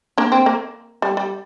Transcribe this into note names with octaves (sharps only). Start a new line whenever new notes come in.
A#3 D4
C4
A#3
G3
G3